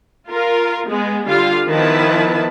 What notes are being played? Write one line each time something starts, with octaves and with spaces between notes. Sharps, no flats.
F4 A#4
G#3 B3
D3 G3 F4 F5
D#3 F3 B3 E4 B4 A5